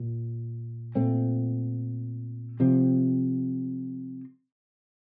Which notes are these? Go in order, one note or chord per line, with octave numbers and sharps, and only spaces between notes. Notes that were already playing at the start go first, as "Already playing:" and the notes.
Already playing: A#2
A#2 A3 C4
C3 F3 C4